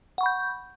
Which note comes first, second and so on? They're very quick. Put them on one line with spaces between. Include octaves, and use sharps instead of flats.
F#5 C#6 B5 G6